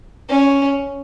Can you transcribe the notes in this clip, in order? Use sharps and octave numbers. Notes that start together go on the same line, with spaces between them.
C#4